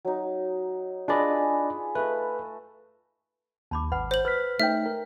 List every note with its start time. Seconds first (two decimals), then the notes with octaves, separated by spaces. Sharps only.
0.05 F#3 D#4
1.08 D4 F4 G#4 B4 D5 D#5
1.95 A3 B4 D#5
3.71 D#2 A5 B5 D6
3.92 G#1 B4 F#5 B5
4.11 C5 C#5 F#7
4.25 B4 E6 F6 B6
4.60 A3 D#4 B4 C#5 E5 G5
4.86 A#4